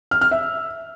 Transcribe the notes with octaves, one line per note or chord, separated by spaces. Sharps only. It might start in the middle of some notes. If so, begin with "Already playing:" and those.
F6
F6
E5